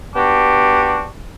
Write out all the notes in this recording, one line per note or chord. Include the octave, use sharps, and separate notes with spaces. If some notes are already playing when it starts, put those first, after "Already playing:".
B3 D4 F#4 G4